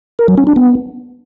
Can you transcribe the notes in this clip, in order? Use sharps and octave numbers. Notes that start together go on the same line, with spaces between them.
A#4
F#3
C#4
D4
B3